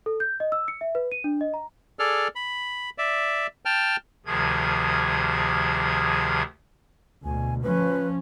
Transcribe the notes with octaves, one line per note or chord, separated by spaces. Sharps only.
A4
G6
D#5
E6
C#7
E5
B4
D#7
D4
D#5
A#5
G#4 A4 D5 F6
B5
D5 E5
G5 A5 F6
D2 C3 D#3 F3 G#4 G#6
D2 B2 G#5
F3 C#4 B4